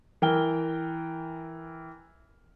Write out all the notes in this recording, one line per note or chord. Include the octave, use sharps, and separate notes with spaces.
E3 A#4 G5 F6 G7